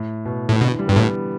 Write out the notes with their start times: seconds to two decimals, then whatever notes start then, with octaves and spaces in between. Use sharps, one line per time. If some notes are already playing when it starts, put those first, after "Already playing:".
Already playing: A2
0.25 B2
0.49 A2
0.61 B2 D3
0.70 E3
0.79 G3
0.87 G2 B3
0.96 A2